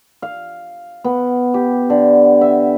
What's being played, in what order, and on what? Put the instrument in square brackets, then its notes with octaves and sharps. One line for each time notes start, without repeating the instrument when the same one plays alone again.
[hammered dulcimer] F5
B3
G4
D3
E5